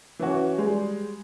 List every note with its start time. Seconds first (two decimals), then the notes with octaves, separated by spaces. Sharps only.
0.19 E3 C#4 F#4
0.58 G3 G#3